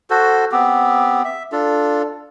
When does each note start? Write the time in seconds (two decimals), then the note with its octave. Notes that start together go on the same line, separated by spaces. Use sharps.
0.10 F#4 A4 C5
0.52 B3 C4 G4
1.24 E5
1.52 D4 F4 A4